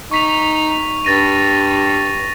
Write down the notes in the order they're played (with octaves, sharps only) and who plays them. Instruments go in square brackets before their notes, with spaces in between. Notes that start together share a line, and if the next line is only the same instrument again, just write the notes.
[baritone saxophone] D#4 [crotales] C#6 B6 F7
[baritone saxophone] G2 [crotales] A6 A#6 D#7